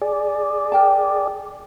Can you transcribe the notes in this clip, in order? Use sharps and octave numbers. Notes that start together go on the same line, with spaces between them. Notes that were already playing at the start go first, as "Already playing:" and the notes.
G#4 D5
A#4 G5 A5